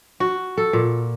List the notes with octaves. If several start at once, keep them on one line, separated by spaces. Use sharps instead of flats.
F#4
A4
A#2